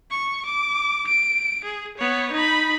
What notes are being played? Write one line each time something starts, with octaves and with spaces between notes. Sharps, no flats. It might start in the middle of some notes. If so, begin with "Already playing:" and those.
C#6
D6
D7
G#4
B3 C#5
D#4 B5